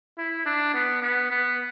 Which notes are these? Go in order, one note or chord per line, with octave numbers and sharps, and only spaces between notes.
E4
D4
B3
B3
B3